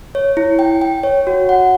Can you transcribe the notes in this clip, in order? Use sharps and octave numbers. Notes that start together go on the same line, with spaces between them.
C#5
E4
G5
G5
C#5
F#4
F#5